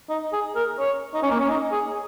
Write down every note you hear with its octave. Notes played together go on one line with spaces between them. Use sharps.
D#4
G#4
A#4
C#5
D#4
C#4
A#3
C#4
D#4
G#4